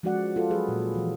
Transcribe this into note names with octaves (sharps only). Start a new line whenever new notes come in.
F3 G#3 C#4 F#4 D5 F#5
F4 A4
F#3 G#4 B4
A#2
E3 F3